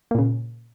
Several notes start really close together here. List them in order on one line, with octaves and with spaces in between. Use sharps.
A#3 A#2 C#3